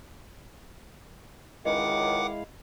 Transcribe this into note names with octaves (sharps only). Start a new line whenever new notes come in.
C#2 D#3 G#3 E4 D#5 F5 F#5 D6